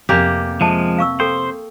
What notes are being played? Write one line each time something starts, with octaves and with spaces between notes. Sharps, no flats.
F2 C3 A#3 B3 G4 G#5 D6
F3 G#3 E5 A5
F5 C#6 E6
A4 C5 G5